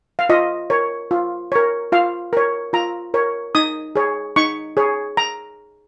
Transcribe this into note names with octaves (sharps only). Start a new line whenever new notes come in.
F5
F4 D#5
A#4 C#5
F4
A#4 C#5
F4 F5
A#4 C#5
F4 A#5
A#4 C#5
D#4 D#6
G#4 C#5
D#4 C#6
G#4 C#5
A#5